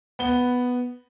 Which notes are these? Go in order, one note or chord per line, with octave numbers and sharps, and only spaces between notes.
B3 G7